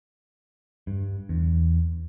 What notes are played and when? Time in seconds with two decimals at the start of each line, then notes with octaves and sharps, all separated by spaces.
0.87 G2
1.29 E2